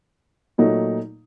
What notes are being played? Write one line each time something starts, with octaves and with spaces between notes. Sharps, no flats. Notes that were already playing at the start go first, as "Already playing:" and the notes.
A#2 F#3 A3 D#4